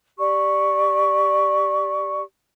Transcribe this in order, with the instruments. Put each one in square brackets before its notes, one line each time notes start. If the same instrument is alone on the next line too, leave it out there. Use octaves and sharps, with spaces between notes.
[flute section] G4 D5 C#6